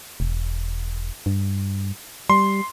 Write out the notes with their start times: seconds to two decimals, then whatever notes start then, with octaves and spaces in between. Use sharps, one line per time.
0.20 E1
1.26 G2
2.30 G3 C6